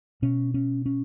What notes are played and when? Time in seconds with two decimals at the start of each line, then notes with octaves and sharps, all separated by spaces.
0.22 B2 C#4
0.54 C#4
0.86 C#4